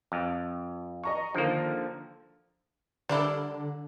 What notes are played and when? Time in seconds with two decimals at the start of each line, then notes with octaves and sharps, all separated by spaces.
0.12 F2
1.04 D#5 A#5 C#6
1.35 D3 D#3 F3 A#3
3.09 D3 G3 D4 E4 A4 A#4 D5